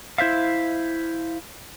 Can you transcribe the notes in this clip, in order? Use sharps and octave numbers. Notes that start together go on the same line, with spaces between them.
E4 C5 E5 F5